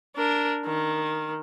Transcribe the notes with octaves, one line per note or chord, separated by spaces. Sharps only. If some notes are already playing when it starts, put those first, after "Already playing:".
D4 A#4
D#3